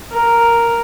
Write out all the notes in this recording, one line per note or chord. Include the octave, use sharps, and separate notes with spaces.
A#4